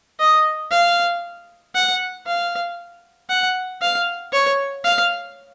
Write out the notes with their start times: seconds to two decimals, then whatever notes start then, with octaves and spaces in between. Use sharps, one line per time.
0.20 D#5
0.71 F5
1.75 F#5
2.27 F5
3.30 F#5
3.82 F5
4.33 C#5
4.85 F5